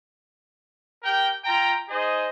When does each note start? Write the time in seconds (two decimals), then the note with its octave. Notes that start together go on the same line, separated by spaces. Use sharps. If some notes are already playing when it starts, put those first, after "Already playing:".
1.03 G4 A#4 G5
1.45 F4 G5 A#5
1.89 D#4 G#4 C5 D#5